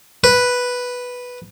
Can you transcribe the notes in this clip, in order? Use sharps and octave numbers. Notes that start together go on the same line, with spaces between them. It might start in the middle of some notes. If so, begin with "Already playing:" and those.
B4